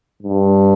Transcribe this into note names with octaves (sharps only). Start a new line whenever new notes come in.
G2